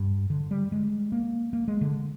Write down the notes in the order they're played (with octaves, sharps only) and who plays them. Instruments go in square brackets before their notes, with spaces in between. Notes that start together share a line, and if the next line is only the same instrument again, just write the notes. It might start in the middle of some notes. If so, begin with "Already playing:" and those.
Already playing: [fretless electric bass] G2
D3
G3
G#3
A#3
A#3
G#3
D3